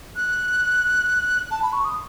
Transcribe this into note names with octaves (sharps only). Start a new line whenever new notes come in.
F#6
A5
B5
C#6
D#6